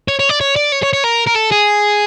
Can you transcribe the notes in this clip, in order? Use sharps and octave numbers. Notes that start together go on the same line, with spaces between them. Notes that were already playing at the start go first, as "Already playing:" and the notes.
C#5
C#5
D5
C#5
D5
C#5
C#5
C#5
A#4
A#4
A4
G#4